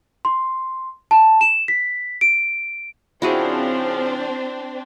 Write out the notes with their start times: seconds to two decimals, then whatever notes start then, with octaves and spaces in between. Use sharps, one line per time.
0.25 C6
1.11 A5
1.41 E7
1.68 B6
2.21 D7
3.22 C#3 F3 C4 D4 E4 F#4 G#4 C5